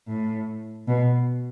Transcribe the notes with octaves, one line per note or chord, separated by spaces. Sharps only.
A2
B2